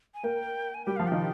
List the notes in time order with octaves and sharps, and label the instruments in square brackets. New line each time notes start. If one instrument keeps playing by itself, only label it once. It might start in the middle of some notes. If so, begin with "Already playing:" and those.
[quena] G#5
[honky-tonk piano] A#3 A#4 [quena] G5
[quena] G#5
[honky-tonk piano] G3 G4 [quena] G5
[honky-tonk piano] F3 F4 [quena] F5
[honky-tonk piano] D#3 D#4 [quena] G5